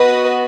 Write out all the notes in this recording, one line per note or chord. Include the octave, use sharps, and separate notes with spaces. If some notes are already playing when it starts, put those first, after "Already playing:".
Already playing: B3 F#4 B4 D#5